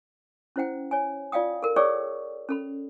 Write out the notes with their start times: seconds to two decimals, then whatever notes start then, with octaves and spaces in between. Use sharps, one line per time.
0.56 C#4 E4 C5 F#5 G5
0.91 C#5 G#5
1.32 F4 D5 F5 G5 D#6
1.63 A4 A#4
1.76 G#4 C#5 D5 G5 C#6 E6
2.49 C#4 A4 B5